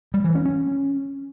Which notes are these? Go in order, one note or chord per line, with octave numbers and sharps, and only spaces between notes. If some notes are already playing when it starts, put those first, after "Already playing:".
G3
E3
C#4
C#4